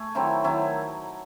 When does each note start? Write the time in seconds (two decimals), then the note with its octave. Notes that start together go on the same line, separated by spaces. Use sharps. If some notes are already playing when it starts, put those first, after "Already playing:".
Already playing: A3 G#5
0.15 D#3 F#3 C4 E4
0.44 D#3 F#3 C4 E4